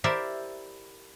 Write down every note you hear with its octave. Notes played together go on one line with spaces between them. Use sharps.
E4 G4 A#4 C5 D5 E5